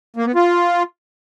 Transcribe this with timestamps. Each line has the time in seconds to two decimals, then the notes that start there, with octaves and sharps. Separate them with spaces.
0.16 A#3
0.26 B3
0.35 F4